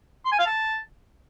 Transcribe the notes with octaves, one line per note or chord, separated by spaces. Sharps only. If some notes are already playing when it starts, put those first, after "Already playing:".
C6
G#5
F5
A5